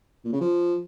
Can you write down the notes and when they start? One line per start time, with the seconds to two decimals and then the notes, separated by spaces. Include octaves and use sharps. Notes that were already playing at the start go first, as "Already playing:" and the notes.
0.25 A#2
0.33 C#3
0.41 F3